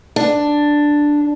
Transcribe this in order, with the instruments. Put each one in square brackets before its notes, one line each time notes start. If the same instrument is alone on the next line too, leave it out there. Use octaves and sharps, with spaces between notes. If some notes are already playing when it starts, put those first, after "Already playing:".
[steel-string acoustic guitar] D4